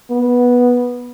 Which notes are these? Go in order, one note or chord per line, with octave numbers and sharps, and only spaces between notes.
B3